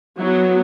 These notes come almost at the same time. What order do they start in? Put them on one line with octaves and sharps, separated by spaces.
F#3 E4 B3